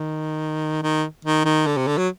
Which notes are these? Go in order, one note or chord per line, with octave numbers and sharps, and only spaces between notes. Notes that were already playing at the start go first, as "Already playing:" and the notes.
Already playing: D#3
D#3
D#3
D#3
D3
C3
D3
F#3